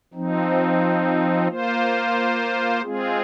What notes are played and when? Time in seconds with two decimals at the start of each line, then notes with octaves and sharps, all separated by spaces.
0.14 F3 C4 D#4
1.47 A#3 F4 C5
2.82 G#3 C4 F4 G#4